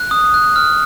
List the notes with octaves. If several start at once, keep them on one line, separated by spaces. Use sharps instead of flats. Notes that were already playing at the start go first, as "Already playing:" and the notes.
Already playing: F#6
D#6
F#6
F6